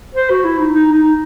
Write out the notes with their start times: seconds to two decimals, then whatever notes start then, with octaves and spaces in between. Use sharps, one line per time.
0.15 C5
0.30 F#4
0.45 E4
0.59 D#4
0.73 D#4
0.92 D#4